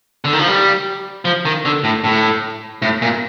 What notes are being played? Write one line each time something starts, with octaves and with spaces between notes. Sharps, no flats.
D3
D#3
F3
G3
F3
D#3
D3
A2
A2
A2
A#2